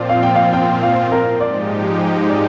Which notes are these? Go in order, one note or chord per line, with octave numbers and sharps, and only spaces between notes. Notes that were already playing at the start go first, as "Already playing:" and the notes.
Already playing: A#2 F3 C4 F4 D5
F5
G5
F5
G5
F5
A#4
G#2 F3 G#3 D#4 G4 D5
D5